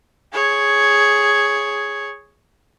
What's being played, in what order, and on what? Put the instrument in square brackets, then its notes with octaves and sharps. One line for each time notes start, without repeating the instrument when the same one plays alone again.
[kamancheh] G#4 C#5